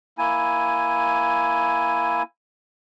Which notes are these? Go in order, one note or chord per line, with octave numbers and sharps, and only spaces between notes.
A#3 E4 G#5